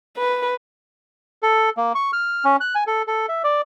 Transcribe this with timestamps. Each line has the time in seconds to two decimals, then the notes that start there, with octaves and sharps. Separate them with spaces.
0.17 B4
1.43 A4
1.77 A#3
1.95 C#6
2.13 F6
2.45 C#4
2.61 F#6
2.75 G#5
2.87 A4
3.08 A4
3.29 E5
3.44 D5